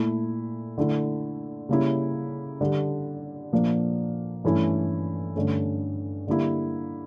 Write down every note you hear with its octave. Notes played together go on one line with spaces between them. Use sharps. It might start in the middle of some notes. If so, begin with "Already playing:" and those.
Already playing: A#2 A3 E4
D3 A3 E4
C#3 G3 A#3 C#4 E4
D3 G3 D4
A#2 F3 A#3 D4
G2 E3 A3 C#4 E4
G2 D3 A3 C#4
D3 G3 A#3 E4